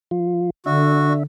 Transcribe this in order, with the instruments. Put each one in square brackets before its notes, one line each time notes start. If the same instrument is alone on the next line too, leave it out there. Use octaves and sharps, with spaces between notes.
[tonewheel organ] F3 F4
[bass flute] D3 [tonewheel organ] D4 E5 [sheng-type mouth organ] F#4